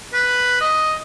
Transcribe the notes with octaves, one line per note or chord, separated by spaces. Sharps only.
B4
D#5